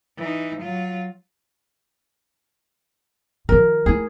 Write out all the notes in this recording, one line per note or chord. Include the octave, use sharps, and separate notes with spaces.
E3 D#4
F#3 F4
D#3 F3 A#4
A3 E4 G#4